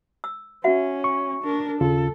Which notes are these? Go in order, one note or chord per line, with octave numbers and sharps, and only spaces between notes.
E6
C#4 F#4 E5 F#5
C#6
D4 A#4
D#2 C#3 F4 A4